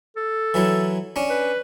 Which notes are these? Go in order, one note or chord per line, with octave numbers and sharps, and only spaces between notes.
A4
E3 F#3 E4
C#4 D4
B4